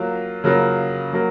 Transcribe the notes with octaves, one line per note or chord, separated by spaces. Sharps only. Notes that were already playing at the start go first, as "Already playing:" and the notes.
Already playing: F#3 A#3 F4
C#3 F#3 A#3 F4
F#3 A#3